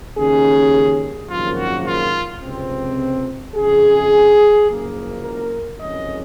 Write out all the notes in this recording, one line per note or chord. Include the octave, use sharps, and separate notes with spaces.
D#2 C#3 G#3 C#4 G#4
G#1 F#2 C#3 F3 A#3 F4
F#4
F4
C#2 C3 F3 C4
F2 C#3 G#3 G#4
F#1 F#2 F3 A#3
A#4
F#1 F2 C#3 G#3 C#4 D#5